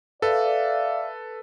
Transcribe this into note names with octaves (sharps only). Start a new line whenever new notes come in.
A4 B4 D5 E5 F5